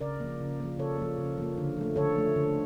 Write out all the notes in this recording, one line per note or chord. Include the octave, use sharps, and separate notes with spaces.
C#3 A#4 D5
F3 A#3
C#3
F3 A#3
C#3 A4 C#5
F3 A#3
C#3
F3 A#3
D3
F3 A3
D3 A4 C#5
F3 A3
D3